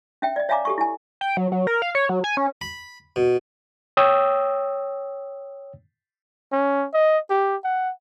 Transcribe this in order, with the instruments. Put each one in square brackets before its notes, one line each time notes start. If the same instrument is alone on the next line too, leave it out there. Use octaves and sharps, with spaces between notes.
[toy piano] C#4 E5 G5
D5 D#5
C#5 E5 F5 G#5 A#5 D6
G4 A4 C#6
E4 G#5
[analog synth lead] G5
F#3
F#3
A#4
F5
C#5
F#3
G#5
C#4
[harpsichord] B5
B2
[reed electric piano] C#5 G5 D#6 E6
[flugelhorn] C#4
D#5
G4
F#5